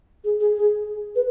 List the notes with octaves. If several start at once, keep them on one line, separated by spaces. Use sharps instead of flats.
G#4
G#4
G#4
B4